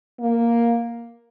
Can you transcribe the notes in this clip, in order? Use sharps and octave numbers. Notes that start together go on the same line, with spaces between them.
A#3